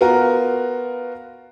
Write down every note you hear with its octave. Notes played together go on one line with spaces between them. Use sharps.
B3 F4 F#4 A#4